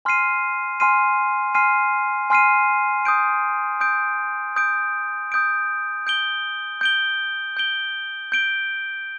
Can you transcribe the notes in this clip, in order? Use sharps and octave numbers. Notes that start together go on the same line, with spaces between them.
G#5 C6 F6 C7 D#7
G#5 C6 F6 C7 D#7
G#5 C6 F6 C7 D#7
G#5 C6 F6 C7 D#7
D#6 G6 D7
D#6 G6 D7
D#6 G6 D7
D#6 G6 D7
G6 D7 G7
G6 D7 G7
G6 D7 G7
G6 D7 G7